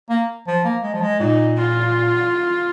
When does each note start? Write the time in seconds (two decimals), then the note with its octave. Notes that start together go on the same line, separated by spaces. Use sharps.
0.10 A#3
0.47 F3
0.64 A#3
0.83 G#3
0.94 F3
1.02 G#3
1.20 A#2 D#4
1.56 F4